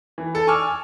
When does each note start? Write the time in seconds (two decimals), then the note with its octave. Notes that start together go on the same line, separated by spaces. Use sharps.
0.18 E3
0.35 A4
0.47 G#5 C#6 D6 E6 F6
0.67 G#5